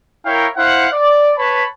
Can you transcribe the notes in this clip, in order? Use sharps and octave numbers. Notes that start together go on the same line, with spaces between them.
E4 A#4 C#5 F5 G5
E4 C5 F5 F#5
D5
B4 C#5 A5 B5